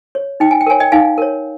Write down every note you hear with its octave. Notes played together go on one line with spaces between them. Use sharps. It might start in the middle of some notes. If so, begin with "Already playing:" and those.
C#5
D#4 G5
G#5
G5
A#4 C#5 G#5
D#5 G5
D#4 F5 G#5
A#4 C#5